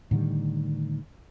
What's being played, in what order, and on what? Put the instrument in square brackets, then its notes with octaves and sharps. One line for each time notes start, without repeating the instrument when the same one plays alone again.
[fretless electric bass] A2 D3 D#3 G3